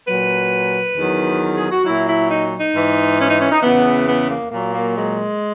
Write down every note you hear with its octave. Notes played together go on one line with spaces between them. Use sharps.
A#2 F#3 B4
E2 D#3 F#3
G#4
F#4
A#2 F#3 E4
E4
D#4
D#4
G#2 E3
C#4
D#4
C#4
D#4
E2 C#3 E3 B3
B3
A#3
A#2 F#3 A#3
A#3
G#3